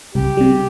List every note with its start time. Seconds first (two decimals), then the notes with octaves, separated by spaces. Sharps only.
0.15 C2 G4
0.37 C3 G3